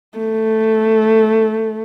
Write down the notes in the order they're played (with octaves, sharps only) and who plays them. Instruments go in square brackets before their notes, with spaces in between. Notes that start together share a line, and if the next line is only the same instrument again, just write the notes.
[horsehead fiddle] A3